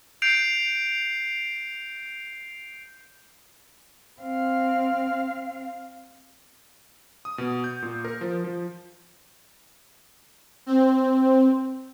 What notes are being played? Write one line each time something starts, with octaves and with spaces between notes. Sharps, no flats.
G6 C7 D7 F7
C4 F5
D#6
B2
G6
A#2
A#4
F3
F3
C4